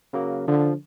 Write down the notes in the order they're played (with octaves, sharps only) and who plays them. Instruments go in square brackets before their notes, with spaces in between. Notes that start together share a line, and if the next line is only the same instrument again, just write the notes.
[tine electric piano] C#3 F#3 A#3
[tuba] D3 [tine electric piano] F3